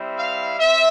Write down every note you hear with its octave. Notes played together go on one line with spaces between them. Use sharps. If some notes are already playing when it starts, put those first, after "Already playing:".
Already playing: G3 C4 E4
F5
C4 E5